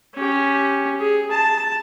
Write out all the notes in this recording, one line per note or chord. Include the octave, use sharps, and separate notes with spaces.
C#4 G4
G#4
A5